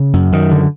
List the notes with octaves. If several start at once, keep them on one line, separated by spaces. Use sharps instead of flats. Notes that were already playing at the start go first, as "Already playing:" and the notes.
Already playing: C#3
F#2
F#2 D#3
D3